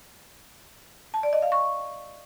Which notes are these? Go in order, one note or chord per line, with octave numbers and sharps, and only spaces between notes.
A5
D5
D#5
F5
C#6